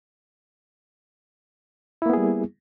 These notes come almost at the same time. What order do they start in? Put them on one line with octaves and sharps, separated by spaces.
E4 A#3 B3 G#4 G3